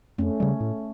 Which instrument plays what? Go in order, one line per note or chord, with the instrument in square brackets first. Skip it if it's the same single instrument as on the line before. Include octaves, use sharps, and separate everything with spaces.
[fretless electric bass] F2 [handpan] A3 C#4
[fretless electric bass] C#3 G3
A2